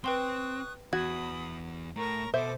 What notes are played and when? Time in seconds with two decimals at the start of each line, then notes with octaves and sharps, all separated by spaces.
0.04 C4 B4 G5 C6 C#6 D#6 F#6
0.93 E2 F#4 B5 D#6 G#6
1.96 A2 A3 A#4 A#5 C#6
2.34 B2 A4 C5 E5 D6